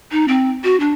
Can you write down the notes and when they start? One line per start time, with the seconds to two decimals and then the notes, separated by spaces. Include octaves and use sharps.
0.11 D#4
0.28 C4
0.64 F#4
0.80 D4